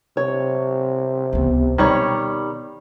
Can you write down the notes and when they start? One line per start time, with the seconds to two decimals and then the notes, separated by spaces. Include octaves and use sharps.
0.17 C3 C#5
1.33 C#2 B3
1.78 B2 D#3 G3 C#5